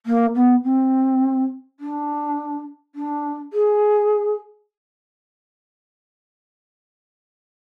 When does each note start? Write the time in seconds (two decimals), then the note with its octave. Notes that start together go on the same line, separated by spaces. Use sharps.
0.06 A#3
0.35 B3
0.64 C4
1.80 D4
2.95 D4
3.53 G#4